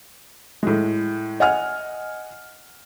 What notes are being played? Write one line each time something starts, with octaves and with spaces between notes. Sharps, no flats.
A2 G#3
D#5 F#5 G#5 F6